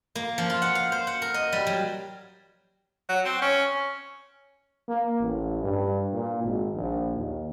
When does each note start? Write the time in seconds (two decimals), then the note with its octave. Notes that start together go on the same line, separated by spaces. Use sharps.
0.15 A#3
0.38 F3
0.50 F4
0.62 F#5
0.75 F5
0.92 C5
1.07 F#5
1.22 A#4
1.34 D#5
1.53 G3
1.67 F#3
3.09 F#3
3.25 C4
3.42 C#4
4.88 A#3
5.20 A1
5.63 G2
6.13 A#2
6.43 G#1
6.75 A#1
7.16 D#2